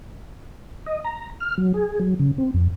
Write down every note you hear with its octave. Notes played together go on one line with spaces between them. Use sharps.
D#5
A#5
F6
F#3
G#4
F#3
C#3
C4
F2